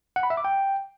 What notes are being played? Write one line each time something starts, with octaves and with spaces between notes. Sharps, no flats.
F#5
B5
E5
D6
G5